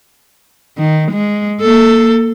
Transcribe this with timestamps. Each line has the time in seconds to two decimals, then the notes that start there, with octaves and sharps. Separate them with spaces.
0.78 D#3
1.12 G#3
1.61 A#3 A4